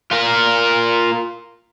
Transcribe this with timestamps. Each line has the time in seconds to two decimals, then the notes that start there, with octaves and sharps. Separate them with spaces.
0.11 F4 A#4